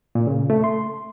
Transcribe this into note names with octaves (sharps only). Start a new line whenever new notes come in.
A#2
C#3
A3
C6